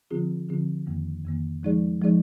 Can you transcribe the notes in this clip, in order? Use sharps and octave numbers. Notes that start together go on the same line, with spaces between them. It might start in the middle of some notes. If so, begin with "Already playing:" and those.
D3 F3 C4 F4 G#4
D3 F3 C4 F4 G#4
F2 D#3 A#3
F2 D#3 A#3
F3 G#3 D#4 G#4 D5
F3 G#3 D#4 G#4 D5